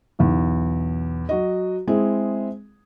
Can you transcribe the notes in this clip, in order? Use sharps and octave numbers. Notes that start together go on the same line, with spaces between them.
B1 E2
F#3 F#4 D#5
G#3 C4 E4 G#4